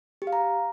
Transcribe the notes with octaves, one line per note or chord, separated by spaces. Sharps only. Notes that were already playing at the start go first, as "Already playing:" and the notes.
G4
F5
A#5